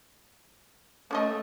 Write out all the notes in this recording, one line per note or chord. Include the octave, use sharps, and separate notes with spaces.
A3 C#4 A4 D#5